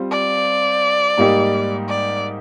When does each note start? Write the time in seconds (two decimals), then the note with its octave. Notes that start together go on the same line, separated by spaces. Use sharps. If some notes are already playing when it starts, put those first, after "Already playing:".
Already playing: G3 C4 F4 C5
0.11 D5
1.17 G#2 G3 A#3 D#4 G4
1.88 D5